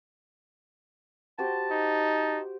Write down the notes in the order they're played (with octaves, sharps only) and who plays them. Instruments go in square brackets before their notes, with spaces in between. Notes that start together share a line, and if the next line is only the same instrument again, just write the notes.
[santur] F#4 G4 C5 [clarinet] A5
[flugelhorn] D#4